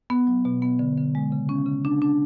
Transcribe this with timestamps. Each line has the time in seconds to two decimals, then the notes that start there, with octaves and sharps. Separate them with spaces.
0.10 B3
0.27 F#3
0.45 B2
0.62 B3
0.79 D3
0.97 D3
1.15 G#3
1.32 C#3
1.49 C#4
1.66 C#3
1.85 D4
2.02 D4